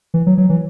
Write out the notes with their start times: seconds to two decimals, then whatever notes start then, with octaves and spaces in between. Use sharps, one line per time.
0.14 E3
0.26 F#3
0.38 F#3
0.50 E3